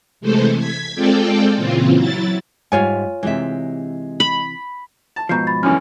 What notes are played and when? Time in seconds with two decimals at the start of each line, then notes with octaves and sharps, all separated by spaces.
0.21 C3 E3 G#3 A3 A4 C5
0.58 G#6 B6
0.95 G#3 C4 F4 A4 D5 G5
1.56 A#2 C#3 E3 C4 F4
1.95 F#3 E4 A6
2.72 G#2 G3 F4 C#5 G#5
3.23 C3 E3 G#3 G4 E5
4.20 B5
5.16 A5
5.29 G#2 B2 F3 A#5 G6 C7
5.47 B5 A6
5.63 F#2 D3 E3 C#4 F6